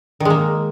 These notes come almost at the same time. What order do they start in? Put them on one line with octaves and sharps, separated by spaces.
D#3 G#3 A#3